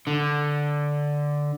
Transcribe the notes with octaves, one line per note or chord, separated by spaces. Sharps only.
D3